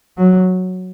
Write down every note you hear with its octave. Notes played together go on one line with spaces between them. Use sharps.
F#3